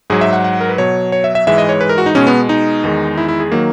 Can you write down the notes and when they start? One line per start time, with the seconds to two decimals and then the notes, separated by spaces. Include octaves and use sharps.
0.10 G#2 F#3 G#4
0.21 E5
0.33 F#5
0.44 F#5
0.61 A#4
0.69 B4
0.78 B2 F#3 C#5
1.12 C#5
1.24 E5
1.35 E5
1.47 G#2 E3 G#3 E5
1.58 D#5
1.69 C#5
1.81 B4
1.89 A#4
1.98 F#4
2.06 D#4
2.15 B2 G#3 C#4
2.27 B3
2.49 D#4
2.84 E2 D#3 G#3
3.17 E4
3.28 E4
3.40 G#4
3.52 D#3 F#3 A#3